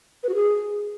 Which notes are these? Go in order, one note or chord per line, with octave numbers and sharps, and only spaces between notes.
B4
F#4
G#4